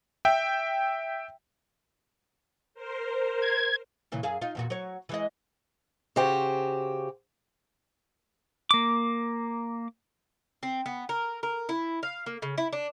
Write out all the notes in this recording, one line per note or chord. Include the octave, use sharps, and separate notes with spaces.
E5 G5
A#4 C5
G#6
A#2 C#3 E3
F#2 G#4 F5
D#4 F4
E2 A#2 F#4
F#3 C#5
E3 G#3 D#5
C#3 F#4 G4 C5
A#3 D6
C4
B3
A#4
A#4
E4
F5
A#3
C#3
E4
D4